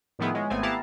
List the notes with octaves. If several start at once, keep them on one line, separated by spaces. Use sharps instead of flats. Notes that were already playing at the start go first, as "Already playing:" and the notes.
A2 D#3 F3 B3 E4 G#4
G#3 C#4
G#1 A3 B3 C4 G#5
B3 E4 G4 F5 A5 A#5